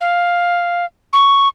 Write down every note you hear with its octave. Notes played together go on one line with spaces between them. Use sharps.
F5
C#6